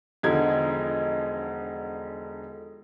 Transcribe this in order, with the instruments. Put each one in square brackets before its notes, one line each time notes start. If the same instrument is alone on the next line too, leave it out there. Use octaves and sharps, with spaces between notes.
[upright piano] E1 D3 F3 D#4 G#6